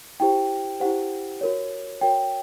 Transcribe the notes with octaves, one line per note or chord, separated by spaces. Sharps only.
E4 G4 C5 G5
E4 G4 C5 F#5
F#4 A#4 C#5
F#4 A#4 C#5 G5